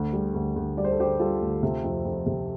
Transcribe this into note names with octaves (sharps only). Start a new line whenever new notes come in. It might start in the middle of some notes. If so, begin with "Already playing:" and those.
Already playing: D2
G3
D2
D2
G3 D5
C5
A4
D3 G4 C5
G3 F4 A4
D2
C3
F2
F2
C3